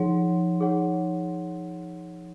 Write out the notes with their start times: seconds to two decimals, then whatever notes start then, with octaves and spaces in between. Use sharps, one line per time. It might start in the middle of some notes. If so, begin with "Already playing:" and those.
Already playing: F3 D#4 G#4 C#5 F#5
0.61 D#4 G#4 C#5 F#5